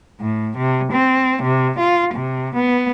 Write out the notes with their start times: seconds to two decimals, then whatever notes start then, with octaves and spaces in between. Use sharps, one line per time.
0.20 A2
0.57 C3
0.92 C4
1.43 C3
1.79 F4
2.14 C3
2.55 B3